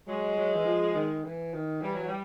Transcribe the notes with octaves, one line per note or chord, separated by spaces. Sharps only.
F#3 G#3
F#3
E3
F3
D#3
E3
D#3
E3 G3
F#3
G3